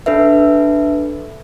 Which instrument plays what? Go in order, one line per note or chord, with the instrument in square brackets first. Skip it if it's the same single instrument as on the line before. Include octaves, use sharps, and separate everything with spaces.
[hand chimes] D4 A4 B4 E5